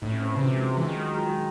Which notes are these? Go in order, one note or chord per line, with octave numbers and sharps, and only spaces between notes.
A2 D#4
C#4
C4
E3
C#3
C3 F#3
G#3
F#3
G#3
E3
D#3 F#3
G#3
F#3
G#3
F#3
G#3